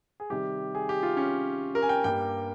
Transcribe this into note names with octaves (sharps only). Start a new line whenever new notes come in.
G#4
C3 D#3 G3 G4
G#4
G4
F4
C#4
A#4
G#5
G5
G2 G3 A#3 G5